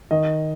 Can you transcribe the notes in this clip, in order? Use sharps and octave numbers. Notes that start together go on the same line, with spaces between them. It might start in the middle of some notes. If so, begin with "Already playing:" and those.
D#3 D#5